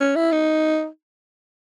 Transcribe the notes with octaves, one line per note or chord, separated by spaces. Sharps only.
C#4
E4
D#4